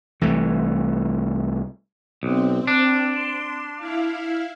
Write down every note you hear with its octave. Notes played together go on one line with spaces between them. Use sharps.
C2 E3 A3
B1 C4
D4
C6
E4 F5